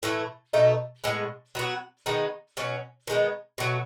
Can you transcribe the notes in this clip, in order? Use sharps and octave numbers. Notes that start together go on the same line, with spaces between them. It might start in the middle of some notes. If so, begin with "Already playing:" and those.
A2 E3 A3
B2 A3 D#4
A2 G#3 B3
F#3 B3 F#4
D#3 G#3 B3 D#4
B2 F#3 C#4
D#3 G#3 B3 D#4
B2 F#3 A3